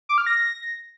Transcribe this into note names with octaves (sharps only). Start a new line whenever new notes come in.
D6
F6
A#6